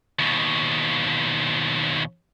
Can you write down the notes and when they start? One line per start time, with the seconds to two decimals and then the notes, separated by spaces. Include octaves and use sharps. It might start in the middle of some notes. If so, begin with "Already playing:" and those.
0.19 D#2 B2